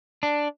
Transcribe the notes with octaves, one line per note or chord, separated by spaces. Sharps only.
D4